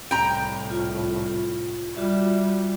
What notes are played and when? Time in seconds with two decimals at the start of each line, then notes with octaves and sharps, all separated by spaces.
0.11 C2 A2 G5 A#5
0.70 F4
1.96 G3 F4 F#4 E5